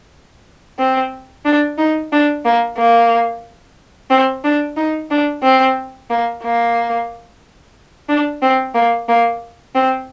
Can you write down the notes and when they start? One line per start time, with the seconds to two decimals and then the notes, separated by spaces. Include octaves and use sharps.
0.79 C4
1.45 D4
1.78 D#4
2.12 D4
2.45 A#3
2.77 A#3
4.11 C4
4.44 D4
4.77 D#4
5.10 D4
5.43 C4
6.10 A#3
6.43 A#3
8.09 D4
8.42 C4
8.75 A#3
9.09 A#3
9.75 C4